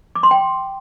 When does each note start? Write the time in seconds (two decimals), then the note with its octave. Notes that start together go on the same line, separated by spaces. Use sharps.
0.15 D6
0.23 C6
0.31 G5